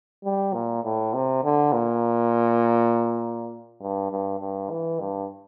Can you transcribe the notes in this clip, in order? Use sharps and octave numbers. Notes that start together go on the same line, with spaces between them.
G3
A#2
A2
C3
D3
A#2
G2
G2
G2
E3
G2